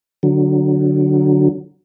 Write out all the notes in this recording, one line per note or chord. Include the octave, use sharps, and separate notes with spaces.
D3 F#3